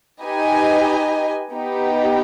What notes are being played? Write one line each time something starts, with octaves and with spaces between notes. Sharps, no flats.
D#4 G4 B4 D#5 G#5
B3 D#4 G4